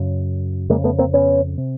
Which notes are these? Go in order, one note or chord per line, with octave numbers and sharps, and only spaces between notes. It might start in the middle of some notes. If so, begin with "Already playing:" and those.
Already playing: F#2 C#3
F2 C#3 G#3 A#3
A3 B3
A#3 C4
B3 C#4
C3